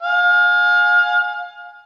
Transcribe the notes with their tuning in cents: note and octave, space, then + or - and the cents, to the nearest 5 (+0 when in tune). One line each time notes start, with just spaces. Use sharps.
F5 +30 G#5 +0